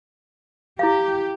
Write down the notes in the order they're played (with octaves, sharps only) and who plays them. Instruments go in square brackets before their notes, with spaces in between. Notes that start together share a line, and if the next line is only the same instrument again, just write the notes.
[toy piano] E4 F5 [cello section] G4